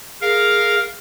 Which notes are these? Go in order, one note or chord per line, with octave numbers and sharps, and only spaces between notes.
G#4 A#4 F5